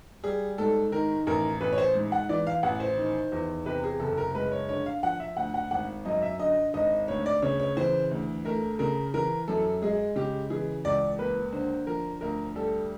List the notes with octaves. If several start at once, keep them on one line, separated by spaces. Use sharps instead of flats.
G3 G#4
G#2 A4
D#3 A#4
A1 A#4
A1 B4
C#5
C5
G#2
F#5
E3 D5
F5
A1 F#5
C5
D#3
E2
C3 B4
G#4
F#1 A4
A#4
G#3 B4
C#5
D3 C#5
F5
F3 F#5
E5
D2 F#5
F#5
G#1 F#5
F#2 D#5
E5
D3 D#5
G#1 D#5
D2 C#5
D5
C#3 C#5
C#5
E3 C5
D2
A3 A#4
C#3 A#4
E3 A#4
F#2 A4
G#3 G#4
C#3 G4
E3 G#4
C#2 D5
A#3 B4
D3 C5
F3 A#4
D2 A#4
G3 A4